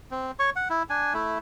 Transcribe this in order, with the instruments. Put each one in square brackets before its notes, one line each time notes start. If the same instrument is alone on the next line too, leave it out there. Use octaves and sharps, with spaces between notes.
[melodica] C4
C#5 C#6
F#5
E4
D4 G#5
A3 E4